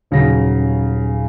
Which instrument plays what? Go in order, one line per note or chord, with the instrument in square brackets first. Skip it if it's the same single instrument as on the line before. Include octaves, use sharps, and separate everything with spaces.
[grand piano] D#1 C#3 F#3 A#6